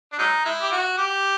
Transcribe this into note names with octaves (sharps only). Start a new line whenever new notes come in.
D4
F#3 G#3 D#4
G#3 E4
G4
F#4
G4